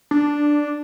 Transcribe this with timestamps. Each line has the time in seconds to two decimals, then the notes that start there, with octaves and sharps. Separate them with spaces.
0.11 D4